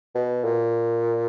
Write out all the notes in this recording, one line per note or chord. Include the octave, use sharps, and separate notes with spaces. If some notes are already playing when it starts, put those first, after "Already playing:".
B2
A#2